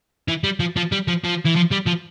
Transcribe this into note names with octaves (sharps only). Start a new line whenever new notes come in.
E3
G3
F3
F3
G3
F3
F3
E3
F3
G3
F3